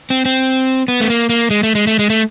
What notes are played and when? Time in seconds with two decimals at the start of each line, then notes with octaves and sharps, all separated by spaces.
0.10 C4
0.25 C4
0.88 B3
1.01 A3
1.10 A#3
1.29 A#3
1.50 G#3
1.63 A3
1.75 G#3
1.87 A3
1.99 G#3
2.10 A3